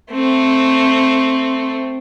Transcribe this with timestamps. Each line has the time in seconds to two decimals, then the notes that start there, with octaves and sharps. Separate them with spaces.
0.11 A3 C4